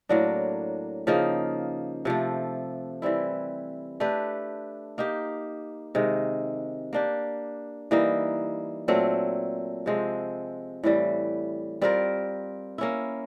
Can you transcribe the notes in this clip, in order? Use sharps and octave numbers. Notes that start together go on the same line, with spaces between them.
A2 F#3 A#3 D4
C#3 F3 A#3 D#4
C3 F3 A3
E3 G3 C4 E4
A3 D4 G4 B4
A#3 D#4 G4
C3 D#3 G#3
A#3 D4 G4
E3 G3 A#3 D#4
A#2 F#3 A3 C4
C3 F3 G#3 C4
A2 E3 G3
G3 C4 F4 A#4
A#3 C#4 E4